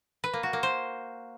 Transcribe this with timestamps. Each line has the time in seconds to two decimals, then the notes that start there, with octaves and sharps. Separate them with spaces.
0.24 B4
0.33 A#3
0.43 F#4
0.53 A#3
0.63 C5